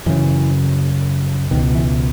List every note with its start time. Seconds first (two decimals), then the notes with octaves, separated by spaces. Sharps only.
0.06 F#2 C#3 E3
1.51 C#2 B2 D#3
1.75 E3